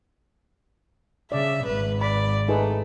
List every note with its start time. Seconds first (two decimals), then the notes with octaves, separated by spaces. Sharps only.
1.32 C#3 D5 E5
1.65 G#1 B4
2.01 D5 B5
2.48 A3 D#4 G#4 B4